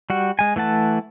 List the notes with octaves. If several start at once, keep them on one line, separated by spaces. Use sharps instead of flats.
G3 F#4
G#3 G#5
E3 A3 F#5 A5